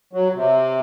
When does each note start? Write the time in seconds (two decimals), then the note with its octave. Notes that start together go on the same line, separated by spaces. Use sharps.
0.13 F#3
0.35 C3